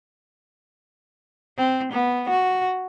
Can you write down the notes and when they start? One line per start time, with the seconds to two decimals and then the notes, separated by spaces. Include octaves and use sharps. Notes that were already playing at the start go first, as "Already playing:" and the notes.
1.58 C4
1.93 B3
2.30 F#4